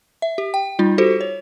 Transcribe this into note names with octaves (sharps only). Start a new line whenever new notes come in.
E5
G4
G5
G3 D#4 F4
F#4 G4 A4 C5
C#5